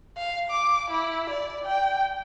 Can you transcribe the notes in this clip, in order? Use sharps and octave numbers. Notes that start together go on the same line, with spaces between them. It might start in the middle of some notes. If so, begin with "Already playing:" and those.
F5
D6
E4
D5
G5